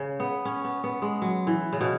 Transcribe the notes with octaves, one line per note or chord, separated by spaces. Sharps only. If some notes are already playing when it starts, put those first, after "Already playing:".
Already playing: C#3
B3
C#4
B3
B3
G#3
F#3
E3
C#3
B2